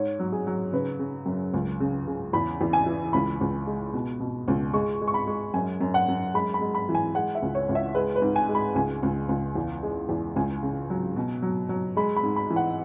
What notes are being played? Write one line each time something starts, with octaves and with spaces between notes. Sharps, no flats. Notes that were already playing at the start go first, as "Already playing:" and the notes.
Already playing: G#2 C#5
F#3
G#4
F#3
C#3 B4
C#3
F#2
C#2
C#3
C#3
E2 B5
E2
G#5
E3
C#2 B5
C#2
G#3
B2
B2
C#2
G#3 C#6
G#3
C#6
B5
G#3
F#2 G#5
F#2
F#5
F#2
G#3 B5
B5
G#3
B5
E3
G#5
G#3 F#5
E5
C#2
C#5
C#2
E5
G#3 B4
B4
G#2
G#5
G#3
B5
C#2 G#5
C#2
C#2
E2
G#3
E2
C#2 G#5
C#3
F#3
B2
F#3
F#3
G#3 B5
B5
G#2
B5
E3
F#5